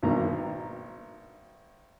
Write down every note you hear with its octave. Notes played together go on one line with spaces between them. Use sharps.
G#1 G2 B2 A#3 A#5